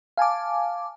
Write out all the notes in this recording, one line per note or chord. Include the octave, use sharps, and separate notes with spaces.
F5 G#5 A5 D6